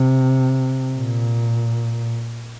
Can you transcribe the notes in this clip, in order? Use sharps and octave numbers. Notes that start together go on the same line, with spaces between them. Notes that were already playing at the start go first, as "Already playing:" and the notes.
Already playing: C3
A#2